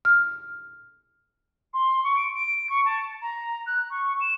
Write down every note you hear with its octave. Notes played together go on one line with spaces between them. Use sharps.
F6
C6
C#6
D7
D7
C#6
A5
A#5
F#6
C#6
E7